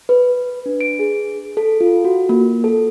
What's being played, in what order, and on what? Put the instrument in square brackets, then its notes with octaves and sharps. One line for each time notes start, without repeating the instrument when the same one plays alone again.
[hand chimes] B4
D4
D7
G#4
A4
F4
F#4
A#3
A4